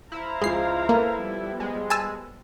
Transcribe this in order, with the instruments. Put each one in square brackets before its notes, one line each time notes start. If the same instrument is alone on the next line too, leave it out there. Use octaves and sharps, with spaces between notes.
[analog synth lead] E4 [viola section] C5 F5 A#5
[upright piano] C#2 F3 [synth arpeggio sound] G#3 C7
[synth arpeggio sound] A#3 [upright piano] A4 B4
[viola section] F3 G3 B3
[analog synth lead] G#3
[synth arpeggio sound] G#5 A5 E6